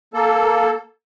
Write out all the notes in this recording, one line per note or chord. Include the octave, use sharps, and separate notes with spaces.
A#3 A4